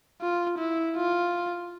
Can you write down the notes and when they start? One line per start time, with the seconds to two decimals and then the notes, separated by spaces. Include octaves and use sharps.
0.22 F4
0.58 E4
0.96 F4